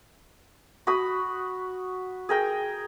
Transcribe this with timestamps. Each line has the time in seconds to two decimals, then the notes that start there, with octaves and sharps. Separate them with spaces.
0.87 F#4 B5 D#6
2.29 G#4 A#4 G5